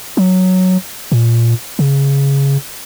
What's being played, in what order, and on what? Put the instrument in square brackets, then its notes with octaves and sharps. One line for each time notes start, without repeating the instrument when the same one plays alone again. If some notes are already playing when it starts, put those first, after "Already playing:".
[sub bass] F#3
A#2
C#3